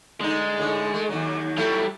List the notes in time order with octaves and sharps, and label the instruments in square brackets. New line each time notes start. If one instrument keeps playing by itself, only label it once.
[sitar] D3 D#4 [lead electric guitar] G#3
[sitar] A2 D3
A3
D#2 F#3
[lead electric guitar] F#3 G3 [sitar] A3 E4 A4